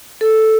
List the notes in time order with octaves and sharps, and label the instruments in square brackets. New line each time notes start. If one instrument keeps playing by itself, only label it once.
[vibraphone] A4